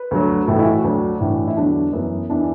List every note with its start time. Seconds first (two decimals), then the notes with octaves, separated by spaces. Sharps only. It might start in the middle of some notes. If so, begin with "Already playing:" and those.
Already playing: B4
0.11 D2 D3 F#3
0.48 A2 E3 A4
0.59 E4
0.66 F#4
0.84 D2 D3 F#3 D4
1.21 A2 E3
1.47 E4
1.57 E2 D3 F#3 D4
1.93 F#2 E3 B3
2.29 E2 E3 D4